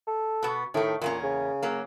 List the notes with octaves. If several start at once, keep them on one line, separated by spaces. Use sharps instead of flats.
A4
B2 B3
A2 D#3 A3
E2 A#2 A#3 C#4
C#3
F#3 A#3